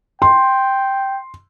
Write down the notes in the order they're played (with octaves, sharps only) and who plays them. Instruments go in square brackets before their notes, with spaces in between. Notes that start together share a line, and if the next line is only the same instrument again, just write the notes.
[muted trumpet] G5 [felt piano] C6